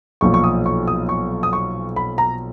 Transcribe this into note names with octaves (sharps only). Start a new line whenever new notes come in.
B1 A#2 F3 C#6
C#6
D#6
C#6
D#6
C#6
D#6
C#6
B5
A#5